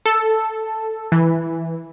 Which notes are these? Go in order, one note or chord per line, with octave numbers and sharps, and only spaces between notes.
A4
E3